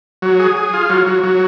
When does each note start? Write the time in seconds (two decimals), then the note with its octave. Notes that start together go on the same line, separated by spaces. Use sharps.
0.22 F#3
0.39 G#4
0.57 G#4
0.74 F4
0.90 F#3
1.07 F#3
1.24 F#3